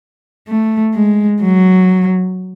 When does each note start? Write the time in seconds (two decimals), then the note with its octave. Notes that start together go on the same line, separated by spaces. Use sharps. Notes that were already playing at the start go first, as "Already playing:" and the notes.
0.48 A3
0.95 G#3
1.41 F#3